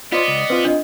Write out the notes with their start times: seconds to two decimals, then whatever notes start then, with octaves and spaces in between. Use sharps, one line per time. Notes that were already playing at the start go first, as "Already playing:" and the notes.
0.12 B3 F4 C5 D5 D#5
0.28 C#2
0.50 C4 F4 B4
0.65 D4 D#5